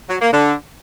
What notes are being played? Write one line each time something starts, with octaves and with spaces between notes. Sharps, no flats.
F#3
A#3
D3